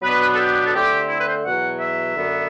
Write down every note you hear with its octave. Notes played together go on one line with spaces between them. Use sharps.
B2 F#3 B3 D4 B4
A4
G4
A4
D3 A3 C4 G4
E4
B4
C5
E2 B2 F#3 F#5
E5
F#2 D3 F#3 B3